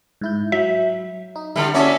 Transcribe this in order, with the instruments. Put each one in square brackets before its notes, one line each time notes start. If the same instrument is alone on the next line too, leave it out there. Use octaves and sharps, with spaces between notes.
[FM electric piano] G#2 E4 G6
[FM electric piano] F#3 [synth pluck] E5
[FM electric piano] D#4
[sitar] D3 G3 [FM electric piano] E4
[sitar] A#3 C#4 [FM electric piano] F#4 A4 D5 [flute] E5